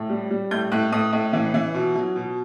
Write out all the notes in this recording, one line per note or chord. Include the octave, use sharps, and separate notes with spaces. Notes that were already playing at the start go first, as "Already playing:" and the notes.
Already playing: A2
G3
G3
A2 G6
A2 F#6
A2 D#6
A2
E3
E3
B2
F#3
B2